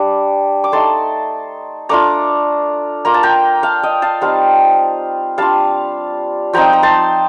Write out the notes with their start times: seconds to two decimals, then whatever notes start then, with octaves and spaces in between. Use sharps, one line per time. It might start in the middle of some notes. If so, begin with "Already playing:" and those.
Already playing: G3 D4 D6
0.64 D6
0.72 A3 D#4 A5 C6
1.89 A3 D4 F4 A#5 D6
3.05 A#3 F4 A#5
3.14 A5
3.23 G5 A#5
3.63 F5 A5
3.83 D#5 G5
4.02 F5 A5
4.21 G3 C4 D#4 F5 A5
5.38 G3 D4 F4 F5 A5
6.53 F3 C4 D#4 G5 A#5
6.73 A#5
6.83 A5 C6